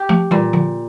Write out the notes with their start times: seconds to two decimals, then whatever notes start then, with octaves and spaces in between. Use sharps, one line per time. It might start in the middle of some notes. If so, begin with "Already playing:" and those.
Already playing: G4
0.09 F3 A3
0.31 A#2 E3 G3
0.53 D3 F3